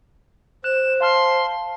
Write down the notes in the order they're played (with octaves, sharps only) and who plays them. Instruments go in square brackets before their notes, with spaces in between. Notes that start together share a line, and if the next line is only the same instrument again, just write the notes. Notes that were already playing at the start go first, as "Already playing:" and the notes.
[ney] C5 [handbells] F#6 [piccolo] E7
[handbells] F5 A5 F6 [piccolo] C6